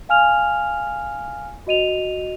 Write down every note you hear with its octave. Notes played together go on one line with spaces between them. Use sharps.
F5 G#5 F6 F7
F#4 D#5 D#7 F7